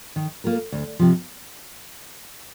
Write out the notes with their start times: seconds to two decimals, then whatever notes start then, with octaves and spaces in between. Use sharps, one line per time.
0.16 D#3
0.44 A#3 F4 A#4
0.72 D2
0.99 C3 F3